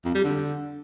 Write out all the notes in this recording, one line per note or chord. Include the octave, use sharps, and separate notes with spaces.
F2
G3
D3